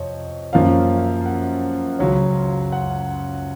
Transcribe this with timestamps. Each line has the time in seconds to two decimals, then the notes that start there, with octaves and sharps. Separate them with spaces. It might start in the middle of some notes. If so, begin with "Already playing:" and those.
Already playing: F2 C3 C#5 D#5
0.53 F#2 F3 A#3 C#4 F5
1.26 F#5
1.99 C#2 C#3 F#3 C#4
2.72 F#5